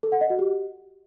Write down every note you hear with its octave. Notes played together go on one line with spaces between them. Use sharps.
A4
F#5
D#5
F#4
G4